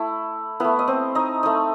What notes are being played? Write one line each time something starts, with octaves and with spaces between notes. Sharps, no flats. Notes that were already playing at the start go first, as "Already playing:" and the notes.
Already playing: A3 E4
A3 B3 E4 B4
D#5
C4 C5
D#4 D#5
A3 D#4